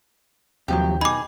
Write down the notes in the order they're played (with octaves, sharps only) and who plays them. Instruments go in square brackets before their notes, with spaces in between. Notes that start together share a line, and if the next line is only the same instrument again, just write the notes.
[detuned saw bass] D#2 [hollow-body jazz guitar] C3 F3 F#3 [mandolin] G4
[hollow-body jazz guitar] B2 D#4 [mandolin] G#4 [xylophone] B5 D6